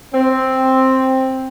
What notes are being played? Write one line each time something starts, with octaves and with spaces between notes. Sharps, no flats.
C4